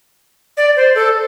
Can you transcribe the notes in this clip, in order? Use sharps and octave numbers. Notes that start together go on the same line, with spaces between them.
D5
C5
A4